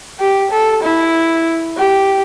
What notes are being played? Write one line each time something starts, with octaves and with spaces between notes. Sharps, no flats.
G4
A4
E4
G4